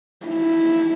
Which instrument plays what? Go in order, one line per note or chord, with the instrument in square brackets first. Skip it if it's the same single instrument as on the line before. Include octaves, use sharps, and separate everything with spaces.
[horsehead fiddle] E4